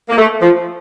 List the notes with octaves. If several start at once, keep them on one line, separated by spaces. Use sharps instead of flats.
A#3
A3
F3